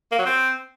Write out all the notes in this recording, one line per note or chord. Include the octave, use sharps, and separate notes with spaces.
A#3
F#3
C4